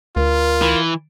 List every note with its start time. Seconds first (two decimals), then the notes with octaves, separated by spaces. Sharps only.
0.16 D2 F4 A#4
0.62 E3